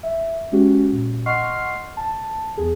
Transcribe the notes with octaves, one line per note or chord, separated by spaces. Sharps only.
E5
G#3 C#4 F#4 G4
A#2
D#5 F#5 C6 C#6 F6 C7
A5
E2 G#4